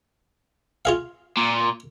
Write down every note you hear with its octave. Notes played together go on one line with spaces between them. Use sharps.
F4 G#4 F5
A#2